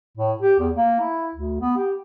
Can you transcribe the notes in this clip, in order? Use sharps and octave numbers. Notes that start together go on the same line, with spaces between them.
A2
G4
E2
A#3
E4
D2
B3
G4